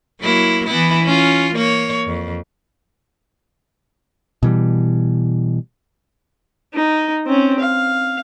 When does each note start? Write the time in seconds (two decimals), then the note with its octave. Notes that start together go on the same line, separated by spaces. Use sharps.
0.21 F#3 A#3 E4
0.67 E3 B3 E4
1.03 C#4 F4
1.55 A#3 C#5
2.07 F2
4.43 B2 E3 G3
6.74 D#4
7.26 C4 C#4
7.59 F5